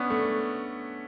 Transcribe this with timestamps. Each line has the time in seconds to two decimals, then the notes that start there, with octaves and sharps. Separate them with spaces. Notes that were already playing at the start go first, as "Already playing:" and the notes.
Already playing: B3 C#4 D4
0.10 A3